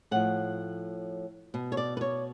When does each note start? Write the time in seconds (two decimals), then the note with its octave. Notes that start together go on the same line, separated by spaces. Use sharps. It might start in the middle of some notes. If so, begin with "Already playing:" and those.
0.11 A2 F3 F#5
1.54 B2
1.72 C#5
1.77 D5
1.97 B4
2.01 C#5